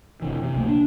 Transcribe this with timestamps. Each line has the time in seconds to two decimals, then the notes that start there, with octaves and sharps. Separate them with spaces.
0.22 F#1 C3 E3
0.43 C3
0.56 C#2 C3 A3 A#3
0.68 D4